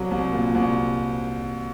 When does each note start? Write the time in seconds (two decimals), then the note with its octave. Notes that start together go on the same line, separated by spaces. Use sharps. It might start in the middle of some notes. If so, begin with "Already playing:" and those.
Already playing: C2 F#3
0.11 C2
0.33 A#2
0.55 C2